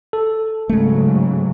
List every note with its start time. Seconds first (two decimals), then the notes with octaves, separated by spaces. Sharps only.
0.13 A4
0.69 G#2 C#3 F#3 G#3 A3